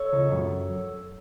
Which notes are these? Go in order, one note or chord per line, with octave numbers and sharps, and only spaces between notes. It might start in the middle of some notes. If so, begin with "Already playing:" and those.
Already playing: A4 C#5
C#2
F#2